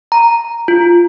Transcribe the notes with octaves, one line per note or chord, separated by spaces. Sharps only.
A#5
F4